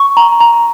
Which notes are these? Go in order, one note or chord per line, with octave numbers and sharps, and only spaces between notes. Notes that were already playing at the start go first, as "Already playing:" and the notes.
Already playing: C#6
A#5
A#5